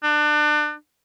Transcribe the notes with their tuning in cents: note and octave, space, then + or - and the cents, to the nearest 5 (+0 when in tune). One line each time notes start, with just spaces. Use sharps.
D4 +30